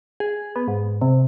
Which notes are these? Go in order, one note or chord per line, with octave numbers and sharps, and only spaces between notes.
G#4
B3
G#2
C3